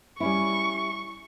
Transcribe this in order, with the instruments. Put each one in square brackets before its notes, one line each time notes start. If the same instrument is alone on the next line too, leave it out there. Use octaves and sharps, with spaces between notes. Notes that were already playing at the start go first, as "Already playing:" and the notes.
[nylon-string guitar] G3 C#4 E4 [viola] C#6